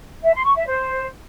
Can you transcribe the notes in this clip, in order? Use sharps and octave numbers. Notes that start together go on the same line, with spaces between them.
E5
C6
C#6
E5
C5